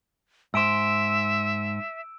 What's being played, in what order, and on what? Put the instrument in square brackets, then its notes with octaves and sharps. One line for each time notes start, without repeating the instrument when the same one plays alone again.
[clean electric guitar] G#2 C5 [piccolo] E5 [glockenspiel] E6 D7 E7